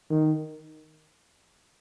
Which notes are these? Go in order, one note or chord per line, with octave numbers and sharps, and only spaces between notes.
D#3